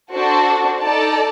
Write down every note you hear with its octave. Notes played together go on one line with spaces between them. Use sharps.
D4 F#4 A4 C5
D#4 A4 D5 A5